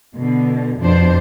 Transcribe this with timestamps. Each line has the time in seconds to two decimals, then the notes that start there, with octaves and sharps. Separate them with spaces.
0.15 B2 D3
0.80 F2 B2 D4 C5